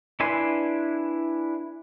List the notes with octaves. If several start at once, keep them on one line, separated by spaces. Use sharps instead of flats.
D4 E4 B4 G#5 C6